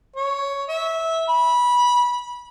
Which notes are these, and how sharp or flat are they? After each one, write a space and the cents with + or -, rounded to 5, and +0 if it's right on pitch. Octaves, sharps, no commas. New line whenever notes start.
C#5 +5
E5 -15
B5 -20